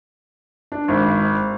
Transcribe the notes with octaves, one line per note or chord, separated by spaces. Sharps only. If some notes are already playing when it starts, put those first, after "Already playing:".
D4
G#1